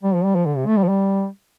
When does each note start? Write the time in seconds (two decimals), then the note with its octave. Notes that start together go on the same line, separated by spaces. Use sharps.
0.03 G3
0.15 F3
0.25 G3
0.35 F3
0.46 D3
0.56 C3
0.67 A3
0.77 G3
0.84 F3
0.89 G3